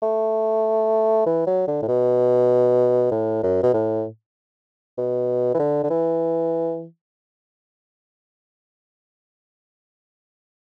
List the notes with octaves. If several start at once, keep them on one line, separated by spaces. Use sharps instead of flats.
A3
E3
F#3
D3
A2
B2
A2
F#2
B2
A2
B2
E3
D3
D3
E3